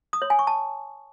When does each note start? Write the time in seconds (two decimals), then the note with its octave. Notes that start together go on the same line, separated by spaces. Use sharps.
0.13 D#6
0.22 C#5
0.30 G#5
0.39 C#6
0.47 A5